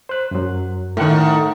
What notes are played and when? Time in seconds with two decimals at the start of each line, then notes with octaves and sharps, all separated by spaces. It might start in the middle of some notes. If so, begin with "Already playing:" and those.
0.09 C5 F#6
0.31 F#2 F#3
0.97 A2 D#3 A3 F#5